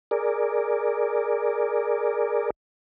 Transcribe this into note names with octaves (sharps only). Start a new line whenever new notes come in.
G#4 A#4 D5